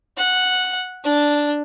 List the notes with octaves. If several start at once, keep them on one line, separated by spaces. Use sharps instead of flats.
F#5
D4